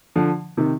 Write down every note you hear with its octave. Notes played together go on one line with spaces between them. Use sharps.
D3 F3
C3 D#3